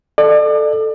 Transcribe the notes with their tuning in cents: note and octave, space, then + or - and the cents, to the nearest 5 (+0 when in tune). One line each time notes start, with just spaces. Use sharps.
A4 +0 D5 +35